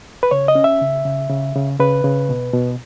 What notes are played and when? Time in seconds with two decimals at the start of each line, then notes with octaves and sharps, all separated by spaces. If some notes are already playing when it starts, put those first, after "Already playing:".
0.23 B4
0.31 C#3 C#5
0.48 D#5
0.55 C#4
0.64 E5
0.81 C#3
1.05 C#3
1.30 C#3
1.55 C#3
1.79 C#3 B4
2.04 C#3
2.29 B2
2.53 B2